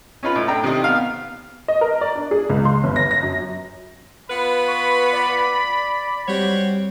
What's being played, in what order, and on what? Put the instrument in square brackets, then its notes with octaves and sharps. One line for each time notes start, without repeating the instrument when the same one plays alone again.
[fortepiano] C#4 D#4 F4 B4
A2
D4 A4 G5 A#5
C3 D#3 C4 D#4 D#5
B3 F5
[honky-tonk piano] D#5
A#4
D5
D4
G#4
C#2
C6
G1
A#6
A#6
F#2
[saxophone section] B3 F4 B4 [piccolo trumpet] B5
[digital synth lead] C#6
D5
[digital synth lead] G3 [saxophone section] C4 F#4 C#5